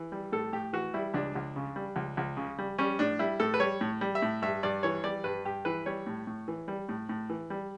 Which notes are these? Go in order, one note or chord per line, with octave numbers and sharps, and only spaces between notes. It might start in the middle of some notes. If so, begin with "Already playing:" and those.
Already playing: E3
G3
A2 A4
A2 G4
E3 F#4
G3 E4
C#2 D4
C#2
C#3
G3
C#2
C#2
C#3
G3
G3 C#4
A2 D4
G3 E4
A2 A4
B4
G3 C#5
A2
G3
E5
A2
G2 E5
G2 D5
E3 C#5
G3 D5
G2 B4
G2 G4
E3 B4
G3 C#5
A2
A2
E3
G3
A2
A2
E3
G3